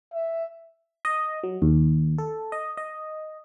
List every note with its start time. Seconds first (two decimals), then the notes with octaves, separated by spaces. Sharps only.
0.14 E5
1.05 D#5
1.43 F#3
1.62 D#2
2.18 A4
2.52 D#5
2.77 D#5